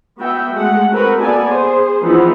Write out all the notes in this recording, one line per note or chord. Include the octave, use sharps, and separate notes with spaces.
B3 F#4 E5 G5
G#3 A3 F#5
C4 F#4 A#4 B4
A#3 B3 A4 D5 G#5
G#4 C5
E3 F3 B3 C4 D#4 E4